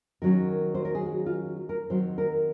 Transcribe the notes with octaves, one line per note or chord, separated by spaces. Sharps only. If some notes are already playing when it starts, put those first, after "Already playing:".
D#3 F#3 C#4 A#4
C5
A#4
G#4
F#4
F4
A#4
D#3 F#3 C4 C5
A#4